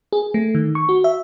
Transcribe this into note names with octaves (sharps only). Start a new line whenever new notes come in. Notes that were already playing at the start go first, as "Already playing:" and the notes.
G#4
A3
D#3
C#6
F#4
E5